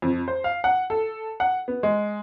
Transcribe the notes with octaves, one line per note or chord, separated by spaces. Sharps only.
F2
C5
F5
F#5
A4
F#5
B3
G#3